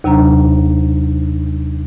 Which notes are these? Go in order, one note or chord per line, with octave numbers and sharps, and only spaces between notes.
D#2 C3 F#3 D4 A#5